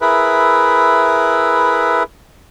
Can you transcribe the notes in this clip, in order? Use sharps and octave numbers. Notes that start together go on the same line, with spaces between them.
E4 G#4 A#4 B4 E5